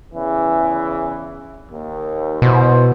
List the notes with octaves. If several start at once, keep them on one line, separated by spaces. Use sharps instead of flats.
E2 C#3 E3
D#2
B2 E4 C5